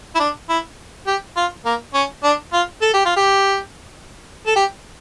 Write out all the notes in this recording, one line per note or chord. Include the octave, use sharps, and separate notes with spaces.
E4
D4
E4
G4
F4
A#3
C#4
D4
F4
A4
G4
F4
G4
A4
G4